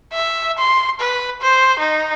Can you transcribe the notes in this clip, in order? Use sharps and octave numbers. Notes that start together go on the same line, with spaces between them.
E5
C6
B4
C5
D#4